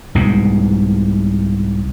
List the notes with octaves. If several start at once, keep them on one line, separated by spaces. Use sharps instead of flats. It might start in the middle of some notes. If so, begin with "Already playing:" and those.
C2 G#2 B2